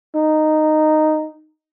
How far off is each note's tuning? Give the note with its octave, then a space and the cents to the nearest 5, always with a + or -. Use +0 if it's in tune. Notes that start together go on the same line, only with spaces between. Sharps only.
D#4 -10